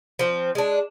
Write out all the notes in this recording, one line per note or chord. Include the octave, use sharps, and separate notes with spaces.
F3 C4
G#3 D4